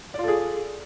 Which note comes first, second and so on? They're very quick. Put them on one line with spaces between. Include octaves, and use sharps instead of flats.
D5 F4 A4 G#4